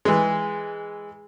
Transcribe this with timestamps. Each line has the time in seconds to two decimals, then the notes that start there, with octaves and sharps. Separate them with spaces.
0.05 E3 G#3